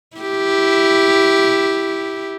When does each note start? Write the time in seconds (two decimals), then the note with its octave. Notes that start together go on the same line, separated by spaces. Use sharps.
0.17 E4 G4